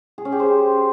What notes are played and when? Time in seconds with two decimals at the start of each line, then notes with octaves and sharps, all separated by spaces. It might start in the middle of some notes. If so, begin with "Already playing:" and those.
0.18 G#4
0.25 C#4
0.32 G4
0.40 C5